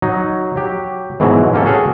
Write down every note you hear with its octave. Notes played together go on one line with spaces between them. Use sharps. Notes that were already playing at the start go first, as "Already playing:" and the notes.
F#3 D#4
F#3 G4
G#2 B2 E3 F#3
A#3 C#4 G4 A4
F#4 G#4 A4 C#5